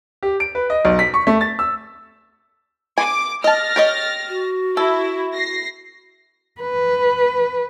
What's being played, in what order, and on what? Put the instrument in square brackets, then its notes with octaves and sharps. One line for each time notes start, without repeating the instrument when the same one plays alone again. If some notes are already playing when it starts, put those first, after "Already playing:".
[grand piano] G4
D7
B4
D#5
B1
B6
C#6
A3
A6
E6
[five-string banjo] G#5 [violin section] D6
[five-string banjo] D#5 A5 [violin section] F6 A6 A#6
[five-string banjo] G4 C#5 D#5
[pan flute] F#4
[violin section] E4 [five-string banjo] A4
[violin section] A#6 C7
[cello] B4